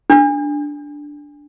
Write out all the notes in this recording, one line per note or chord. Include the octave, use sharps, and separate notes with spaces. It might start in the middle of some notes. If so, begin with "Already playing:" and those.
D4